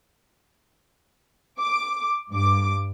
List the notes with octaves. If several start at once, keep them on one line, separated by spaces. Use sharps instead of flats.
D6
G2 D6